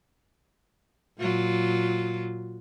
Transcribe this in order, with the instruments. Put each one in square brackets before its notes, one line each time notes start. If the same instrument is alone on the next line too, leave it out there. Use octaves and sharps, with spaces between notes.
[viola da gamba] A#2 F#3 F4